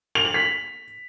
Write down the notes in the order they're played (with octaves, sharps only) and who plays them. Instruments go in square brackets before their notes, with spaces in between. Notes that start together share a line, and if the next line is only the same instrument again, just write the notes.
[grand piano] F7
F#7
B6